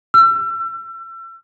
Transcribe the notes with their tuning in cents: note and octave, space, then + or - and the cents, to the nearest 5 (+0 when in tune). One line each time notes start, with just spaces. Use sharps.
E6 +35